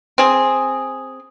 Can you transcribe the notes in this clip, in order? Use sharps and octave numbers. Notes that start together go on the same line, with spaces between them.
C4 G#4